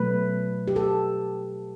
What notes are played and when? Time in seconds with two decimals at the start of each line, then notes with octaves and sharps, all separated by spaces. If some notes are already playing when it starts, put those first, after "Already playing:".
Already playing: B2 F#3 A3 B4
0.68 G4
0.76 A4